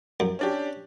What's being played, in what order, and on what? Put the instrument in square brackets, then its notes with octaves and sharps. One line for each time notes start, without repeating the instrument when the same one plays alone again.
[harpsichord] F#2
[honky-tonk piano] C#4 D4 G4